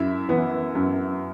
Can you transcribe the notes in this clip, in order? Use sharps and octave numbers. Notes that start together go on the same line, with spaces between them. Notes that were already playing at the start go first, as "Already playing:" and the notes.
Already playing: F#2 E4 E5
E3 B3
F#2